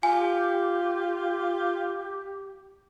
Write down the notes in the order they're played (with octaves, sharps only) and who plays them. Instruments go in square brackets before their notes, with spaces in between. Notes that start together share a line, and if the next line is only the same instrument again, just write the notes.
[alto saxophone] F4 [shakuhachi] G4 [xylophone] G#5